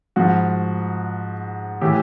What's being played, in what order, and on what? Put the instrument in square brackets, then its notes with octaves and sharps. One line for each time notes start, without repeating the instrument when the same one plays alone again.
[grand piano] G#2 F3 F#4
A2 E3 G4